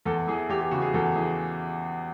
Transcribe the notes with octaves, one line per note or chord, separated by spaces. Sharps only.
E2 A4
E3 G#4
E2 G4
G4
C#3 F#4
G#4
E2 A4
E3 G#4